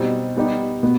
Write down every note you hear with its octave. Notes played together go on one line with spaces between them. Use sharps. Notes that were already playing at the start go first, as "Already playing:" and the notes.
Already playing: B2 G3 C4 D#4
G3 B3 D#4 G4
B2 B3